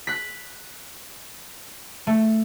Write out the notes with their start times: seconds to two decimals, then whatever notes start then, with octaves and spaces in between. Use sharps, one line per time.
0.07 F#6 B6
2.07 A3